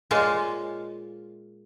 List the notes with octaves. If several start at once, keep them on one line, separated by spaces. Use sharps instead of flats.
A#2 G#3 A#3 F4 C#5 A5